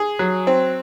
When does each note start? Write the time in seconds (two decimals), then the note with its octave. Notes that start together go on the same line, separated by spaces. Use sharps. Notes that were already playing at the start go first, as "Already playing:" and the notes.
Already playing: G#4
0.19 F#3
0.47 C4